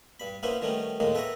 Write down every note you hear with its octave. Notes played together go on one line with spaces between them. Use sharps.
G2 B5
A#3 B3 C#4 E4 B4 C5
D#3 G3 A3 B3 C#4
D#2 A2 D#3 G#3 A#3
A4 B4 C#5 E5 F#5 A#5